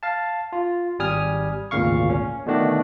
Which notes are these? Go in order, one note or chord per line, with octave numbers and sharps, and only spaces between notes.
F5 A5
F4
G#1 G3 G#5 D#6 F6
G#1 D2 A#2 C#3 F5 C#6
C#4
B2 D3 D#3 A3 D4 F#4